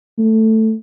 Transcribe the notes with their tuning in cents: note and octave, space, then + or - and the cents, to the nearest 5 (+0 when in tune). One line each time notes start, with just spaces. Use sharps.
A3 +5